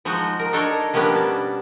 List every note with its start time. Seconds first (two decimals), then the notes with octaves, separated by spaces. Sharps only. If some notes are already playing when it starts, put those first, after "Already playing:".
0.05 F3 G#3 D#4 F#4
0.39 A#4
0.53 D4 D#4 A4 A#4 C#5 D#5
0.93 F3 G3 A#3 B3 C#4 D4
1.14 B2 A5